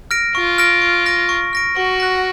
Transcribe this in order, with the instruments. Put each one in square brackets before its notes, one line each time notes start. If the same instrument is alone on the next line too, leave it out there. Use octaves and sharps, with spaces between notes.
[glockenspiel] F6 A#6 D7
[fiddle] F4 [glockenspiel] C#6
[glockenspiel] F6 A#6 D7
C#6
F6 A#6 D7
C#6
F6 A#6 D7
[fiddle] F#4 [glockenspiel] C#6
[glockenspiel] F#6 A#6